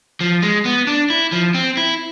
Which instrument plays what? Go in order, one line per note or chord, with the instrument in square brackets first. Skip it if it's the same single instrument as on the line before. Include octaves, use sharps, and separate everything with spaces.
[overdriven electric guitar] F3
G#3
B3
D4
E4
F3
C4
E4